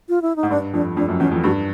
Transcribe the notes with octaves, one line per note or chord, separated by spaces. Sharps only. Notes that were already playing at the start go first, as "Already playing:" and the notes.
F4
E4
D#4
G#2
G2 D4
F2 D4
F2 D4
F#2
E2 C#4
F2
G2 F#4